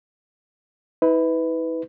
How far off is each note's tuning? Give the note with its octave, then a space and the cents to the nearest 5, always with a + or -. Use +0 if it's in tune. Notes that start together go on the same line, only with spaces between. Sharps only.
E4 -40 B4 +10